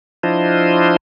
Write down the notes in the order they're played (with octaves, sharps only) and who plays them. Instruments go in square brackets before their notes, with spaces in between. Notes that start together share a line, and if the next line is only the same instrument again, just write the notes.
[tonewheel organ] F3 D4 E4 F4 C5 D#5